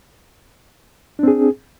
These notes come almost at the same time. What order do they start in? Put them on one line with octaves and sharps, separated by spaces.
D4 C4 G#4